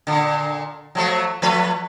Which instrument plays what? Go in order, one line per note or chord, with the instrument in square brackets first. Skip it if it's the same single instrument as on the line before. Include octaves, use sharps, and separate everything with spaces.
[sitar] A#2 D3
F3 F#3 A3
F3 A3 B4